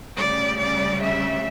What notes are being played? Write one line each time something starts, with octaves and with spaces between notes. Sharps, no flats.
D2 C#3 G3 D5
D5
E5